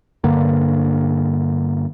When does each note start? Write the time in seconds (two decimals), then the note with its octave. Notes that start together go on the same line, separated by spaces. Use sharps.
0.24 G2 D3 A#3